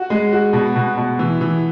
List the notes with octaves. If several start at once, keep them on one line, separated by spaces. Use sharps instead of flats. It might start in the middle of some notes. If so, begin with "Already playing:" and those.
Already playing: F#4
G#3
F#4
B2
B2
B2
E3
E3